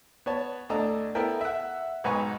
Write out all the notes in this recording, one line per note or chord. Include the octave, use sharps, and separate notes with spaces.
B3 C#5 A5
D2 A2 D4 A4 D#5 A#5
B3 E4 A4 A#4 G5
E5 F#5
B1 G#2 B4 G#5 A#5 C#6